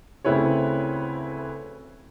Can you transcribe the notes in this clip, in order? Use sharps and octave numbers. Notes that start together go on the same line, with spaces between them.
D2 C#3 C4 E4 B4 C#5